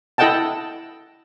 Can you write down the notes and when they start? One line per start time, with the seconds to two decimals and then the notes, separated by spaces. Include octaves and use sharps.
0.18 E4 A4 D#5 F#5 G5 A5